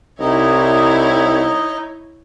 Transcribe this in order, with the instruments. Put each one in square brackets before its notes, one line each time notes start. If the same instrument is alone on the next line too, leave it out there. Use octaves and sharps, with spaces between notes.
[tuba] C2 [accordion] D#4 D#5 [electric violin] E4 C#5